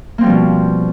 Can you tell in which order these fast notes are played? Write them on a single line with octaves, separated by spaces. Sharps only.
A#3 C4 G3 F3 B2